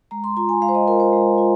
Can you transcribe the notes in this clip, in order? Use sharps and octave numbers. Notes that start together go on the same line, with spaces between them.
G#3 A#5
C6
F4 A#5
G#5
G#3 F5
C5
D#5
F4 A#4
C5
G#3
F4